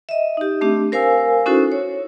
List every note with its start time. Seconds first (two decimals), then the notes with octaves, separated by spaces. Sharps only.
0.09 D#5 E5
0.37 D#4 G4
0.61 A3 C4 D4 G4
0.92 A#4 C5 F5 G#5 E6
1.46 C#4 D#4 E4 F#4 A4 C5
1.72 C#5